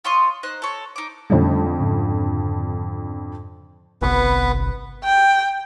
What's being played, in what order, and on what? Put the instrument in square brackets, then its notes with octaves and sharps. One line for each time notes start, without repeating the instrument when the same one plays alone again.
[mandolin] F4 C#5 C6 D#6
D#4 C5 F#6
A4 C#5
D#4 D6
[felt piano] F2 D3 [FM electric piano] G3 A3 C#4
[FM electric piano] G#2 C#3
[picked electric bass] G1 C2 [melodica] B3 B4
[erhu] G5